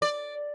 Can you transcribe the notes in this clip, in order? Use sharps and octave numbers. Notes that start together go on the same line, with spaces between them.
D5